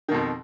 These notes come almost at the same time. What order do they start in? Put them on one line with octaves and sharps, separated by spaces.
D#3 B2 F2